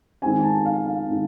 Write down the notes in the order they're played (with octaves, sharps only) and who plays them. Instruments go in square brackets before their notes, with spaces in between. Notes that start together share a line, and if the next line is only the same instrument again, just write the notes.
[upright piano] D#3 G#3 C4 G#5
G#5
A5
F5
F5
D#3 G#3 C4